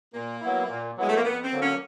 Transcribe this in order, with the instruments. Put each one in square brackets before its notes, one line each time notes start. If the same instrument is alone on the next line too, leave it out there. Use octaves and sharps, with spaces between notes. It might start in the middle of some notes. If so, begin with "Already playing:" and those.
[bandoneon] A#2 [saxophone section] A#3
[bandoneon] F#3 B3 E4
A#2
[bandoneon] F#3 B3 E4 [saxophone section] G#3
[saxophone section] A3
A#3
[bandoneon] F2 [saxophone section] B3
[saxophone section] C4
[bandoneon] D3 F#3 A#3
[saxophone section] C#4